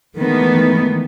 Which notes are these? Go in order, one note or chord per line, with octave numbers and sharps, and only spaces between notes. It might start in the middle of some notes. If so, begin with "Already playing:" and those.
D#3 E3 G#3 A3 B3